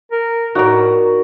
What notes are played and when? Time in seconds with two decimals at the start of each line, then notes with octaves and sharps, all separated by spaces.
0.12 A#4
0.55 A2 D#4 F#4 A#4 D5